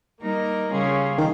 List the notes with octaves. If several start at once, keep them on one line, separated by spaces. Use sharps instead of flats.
G3 A#3 D#4 A#4
C#3 G3 C#4 F4 G#4
D#3